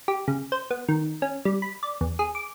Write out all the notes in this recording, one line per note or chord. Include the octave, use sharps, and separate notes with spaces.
G4
C#3
C5
B3
D#3
C#4
G3
B5
D5
E2
G#4
D6